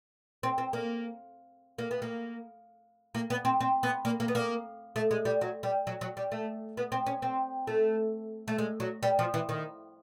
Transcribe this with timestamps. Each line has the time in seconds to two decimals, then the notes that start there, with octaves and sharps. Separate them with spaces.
0.43 C4
0.58 C4
0.73 A#3
1.78 A#3
1.91 B3
2.02 A#3
3.15 A#3
3.30 B3
3.45 C4
3.61 C4
3.83 B3
4.05 A#3
4.20 A#3
4.28 B3
4.35 A#3
4.96 A3
5.11 G#3
5.25 G3
5.41 F#3
5.63 G3
5.87 F#3
6.01 F#3
6.17 G3
6.32 A3
6.77 B3
6.92 C4
7.06 C#4
7.22 C4
7.67 A3
8.48 A3
8.58 G#3
8.80 F#3
9.03 G3
9.19 F3
9.34 E3
9.49 D#3